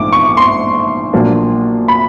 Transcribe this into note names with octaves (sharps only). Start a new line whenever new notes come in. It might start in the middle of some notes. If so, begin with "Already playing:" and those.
Already playing: A#1 G#2 F3 A3 D4 D6
C#6
C6
A#1 A#2 F#3 A#3 D4
B5